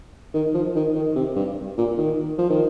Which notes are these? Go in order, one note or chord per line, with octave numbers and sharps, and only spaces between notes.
D#3
F3
D#3
D#3
C3
G2
A#2
D#3
F3
D#3